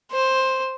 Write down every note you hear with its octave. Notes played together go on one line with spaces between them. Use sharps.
C5